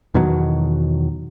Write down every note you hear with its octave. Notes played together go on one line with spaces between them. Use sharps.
E2 B2 D#3 F#3